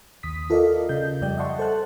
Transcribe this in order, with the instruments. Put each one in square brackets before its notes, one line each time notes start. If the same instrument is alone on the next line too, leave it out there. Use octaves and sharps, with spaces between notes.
[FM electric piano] D#2 D#6 B6
F4 A4 A#4 D5 D#5 F5
C#3 D#5 G6
F2 G3 D5 G5 G6
D#5 E5 F#5 A5 C6 C#6
A4 C5 F#5 A5 F#6